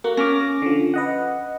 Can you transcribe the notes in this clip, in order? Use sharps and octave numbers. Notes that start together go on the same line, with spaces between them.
A#3 F#4
C#4 D6 F6 A#6
D3 F3
B4 D#5 F#5